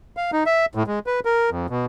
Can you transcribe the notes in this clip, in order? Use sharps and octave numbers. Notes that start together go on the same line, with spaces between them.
F5
D#4
E5
A2
G#3
B4
A#4
F2
B2